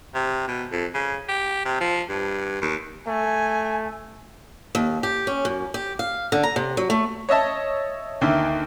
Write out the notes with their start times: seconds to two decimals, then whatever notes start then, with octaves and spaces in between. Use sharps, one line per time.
0.15 C3
0.48 B2
0.72 F2
0.94 C#3
1.29 G4
1.65 C3
1.81 F3
2.09 G2
2.62 D#2
3.07 A3 G#5
4.75 D#2
5.03 G4
5.27 C#4
5.45 F#2
5.74 G4
5.99 F5
6.32 D3
6.43 A#5
6.56 C3
6.77 F#3
6.90 A3
7.29 C#5 D#5 E5 A5
8.21 D2 D#3 A#3 E4 E5